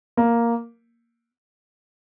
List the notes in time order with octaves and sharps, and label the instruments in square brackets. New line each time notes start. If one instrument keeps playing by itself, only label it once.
[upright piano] A#3